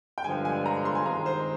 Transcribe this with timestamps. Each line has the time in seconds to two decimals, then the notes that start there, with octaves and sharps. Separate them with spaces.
0.18 G5
0.24 G2 D3 F3 G#3 G#5
0.45 G#5
0.66 A#5
0.85 C6
0.95 G#5
1.05 D#3 G#3 C4 F4 A#5
1.26 C5